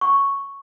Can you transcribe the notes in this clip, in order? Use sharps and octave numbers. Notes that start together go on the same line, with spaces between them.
C#6